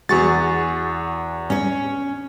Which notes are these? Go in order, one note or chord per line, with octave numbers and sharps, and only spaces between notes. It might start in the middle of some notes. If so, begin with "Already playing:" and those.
E2 F#4 G#4 C#6 A6
C#4 C#5